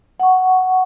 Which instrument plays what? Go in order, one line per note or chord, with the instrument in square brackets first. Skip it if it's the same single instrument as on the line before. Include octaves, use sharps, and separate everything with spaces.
[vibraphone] F#5 C#6